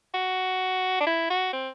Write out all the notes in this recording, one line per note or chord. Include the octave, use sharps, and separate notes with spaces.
F#4
D4
E4
F#4
C4